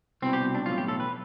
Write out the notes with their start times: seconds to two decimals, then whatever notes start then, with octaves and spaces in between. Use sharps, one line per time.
0.22 C2 B2 C4
0.33 G4
0.55 D4
0.66 B1 A2 E3 F4
0.78 G4
0.88 A4
1.00 B4